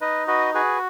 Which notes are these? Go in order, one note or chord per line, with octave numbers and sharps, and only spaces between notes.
D#4 B4 D#5
F#4 B4 D#5
F#4 G#4 B4